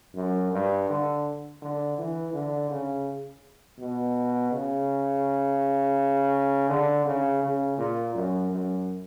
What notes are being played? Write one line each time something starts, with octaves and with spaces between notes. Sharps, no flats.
F#2
G2
D3
D3
E3
D3
C#3
B2
C#3
D3
C#3
C#3
A#2
F#2
F#2